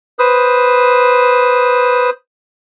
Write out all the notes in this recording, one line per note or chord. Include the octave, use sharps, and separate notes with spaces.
B4 C5 D#6